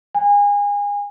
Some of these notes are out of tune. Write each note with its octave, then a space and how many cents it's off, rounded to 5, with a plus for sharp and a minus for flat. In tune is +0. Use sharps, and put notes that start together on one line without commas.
G#5 -30